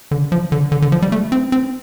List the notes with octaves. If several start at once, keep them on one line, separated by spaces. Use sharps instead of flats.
D3
F3
D3
D3
D3
F3
G3
A3
C4
C4